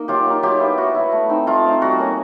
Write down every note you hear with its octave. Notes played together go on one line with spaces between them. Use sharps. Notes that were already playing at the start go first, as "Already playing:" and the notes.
Already playing: A#3 D#4
F#3 F4 G4
A#3 D#4
F#3 F4 G4
B3 E4
F#3 F#4
B3 E4
A3
C4 D#4
A3 F4
C4 D#4
G3 F#4
A#3 C#4